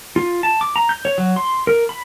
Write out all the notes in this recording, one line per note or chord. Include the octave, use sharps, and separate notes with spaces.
F4
A5
D6
A#5
G6
C#5
F#3
C6
A#4
B5